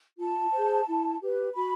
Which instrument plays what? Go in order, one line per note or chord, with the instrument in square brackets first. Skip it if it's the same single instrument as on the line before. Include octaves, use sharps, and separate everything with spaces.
[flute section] F4 A5
G#4 C5
E4
G4 B4
F#4 B5